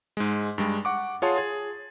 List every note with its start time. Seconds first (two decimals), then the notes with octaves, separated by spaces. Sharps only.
0.17 G#2 G#3
0.58 G2 G3 G#3
0.85 F#5 C#6 D6
1.22 F4 G#4 C#5 F#5 A5 C6
1.36 G#4 A6